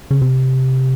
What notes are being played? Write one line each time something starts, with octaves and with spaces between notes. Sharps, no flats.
C#3
C3